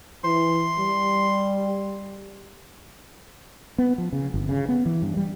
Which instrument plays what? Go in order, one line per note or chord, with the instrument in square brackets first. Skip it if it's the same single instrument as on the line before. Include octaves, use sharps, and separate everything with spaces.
[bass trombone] E3 [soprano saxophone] C6
[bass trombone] G3
[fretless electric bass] B3
F3
C#3
G1
C#3
B3
E3
G2
G3